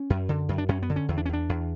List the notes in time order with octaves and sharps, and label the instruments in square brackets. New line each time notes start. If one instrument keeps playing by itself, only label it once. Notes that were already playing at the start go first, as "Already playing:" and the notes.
Already playing: [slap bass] C#4
F#2
D3
F#2
D4
F#2 C#4
B3
D3
C#4
E2
D4
C#4
E2 D4
E2